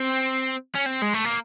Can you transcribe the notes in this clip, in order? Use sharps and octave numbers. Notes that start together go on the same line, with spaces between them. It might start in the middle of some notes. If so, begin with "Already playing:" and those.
Already playing: C4
C#4
C4
G#3
A3
A#3